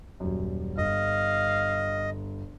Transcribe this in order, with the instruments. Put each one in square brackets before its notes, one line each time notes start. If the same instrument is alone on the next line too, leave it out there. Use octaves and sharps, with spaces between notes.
[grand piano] D#1 F#2
[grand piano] G1 [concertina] D#5 [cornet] F5